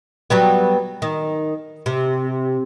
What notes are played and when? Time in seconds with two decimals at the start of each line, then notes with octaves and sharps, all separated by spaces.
0.30 F#3 G3 B3
1.02 D#3
1.86 C3